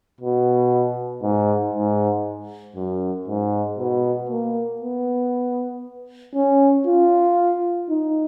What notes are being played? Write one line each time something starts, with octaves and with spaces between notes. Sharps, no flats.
B2
G#2
G#2
F#2
G#2
B2
A#3
B3
C#4
F4
D#4